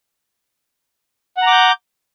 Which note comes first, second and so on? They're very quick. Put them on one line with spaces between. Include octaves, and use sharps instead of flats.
F#5 A#5 D6 G6